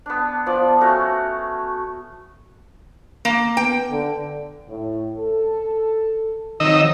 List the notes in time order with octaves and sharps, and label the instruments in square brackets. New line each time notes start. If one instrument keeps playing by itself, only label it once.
[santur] B3 D4
F3 B3 D5
A3 C#4 F#4 F5
[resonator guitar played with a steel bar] A#3
[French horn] B3 [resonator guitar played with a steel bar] G5
[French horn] D3
[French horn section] A2
A4
[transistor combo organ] D#3 D#5 E6 [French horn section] F3 F#3 C4